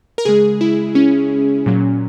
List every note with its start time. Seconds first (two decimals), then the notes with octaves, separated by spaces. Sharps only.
0.18 A#4
0.25 C#3 G#3 G#4
0.61 E4
0.95 C#4
1.66 A#2 F#3